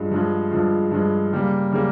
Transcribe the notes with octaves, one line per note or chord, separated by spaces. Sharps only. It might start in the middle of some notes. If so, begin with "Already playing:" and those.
Already playing: G2 F3 G#3
G2 F3 G#3
G2 F3 G#3
G2 F3 G#3
C#3 G3 A#3
C#3 G3 A#3